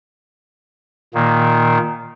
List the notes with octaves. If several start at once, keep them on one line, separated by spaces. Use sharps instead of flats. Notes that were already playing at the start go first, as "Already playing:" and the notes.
A#2 D#3 A#3